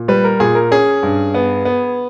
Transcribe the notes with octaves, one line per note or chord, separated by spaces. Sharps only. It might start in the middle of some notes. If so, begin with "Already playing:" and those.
Already playing: A#2
G3 B4
A#4
A#2 G#4
A#4
C#4 G#4
G2
B3
B3